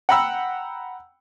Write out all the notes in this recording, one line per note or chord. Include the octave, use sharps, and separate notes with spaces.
F#5 G5 A#5 B5 E6